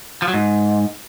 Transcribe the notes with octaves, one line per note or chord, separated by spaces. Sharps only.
F3
F#3
G#2